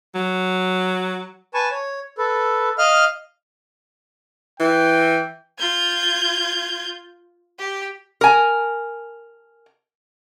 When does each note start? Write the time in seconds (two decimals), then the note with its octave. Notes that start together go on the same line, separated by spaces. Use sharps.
0.15 F#3
1.54 B4 G#5 A5 C#6
1.71 C#5
2.18 A4 B4
2.78 D#5 F5 F6
4.60 E3 G5
5.60 F4 G6 G#6
7.59 G4
8.21 A#4 G#5